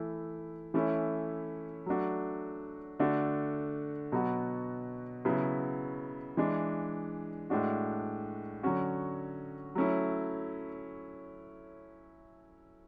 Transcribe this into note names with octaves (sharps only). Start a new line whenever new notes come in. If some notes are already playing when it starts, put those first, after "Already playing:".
Already playing: E3 A3 E4
E3 A3 C#4 E4
F#3 A3 D4 F#4
D3 A3 D4 F#4
B2 F#3 B3 F#4
C#3 F#3 B3 E4
E3 G#3 D4
A2 G#3 D4 F#4
D3 F#3 C#4 F#4
F#3 A3 C#4 E4